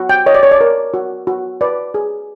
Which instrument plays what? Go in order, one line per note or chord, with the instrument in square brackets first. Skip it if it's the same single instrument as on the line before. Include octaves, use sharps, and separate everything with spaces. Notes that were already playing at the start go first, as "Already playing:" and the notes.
Already playing: [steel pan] F#4
G5
C#5 D#5
D5
C#5
D5
A#4
F#4
F#4
B4 D5
G#4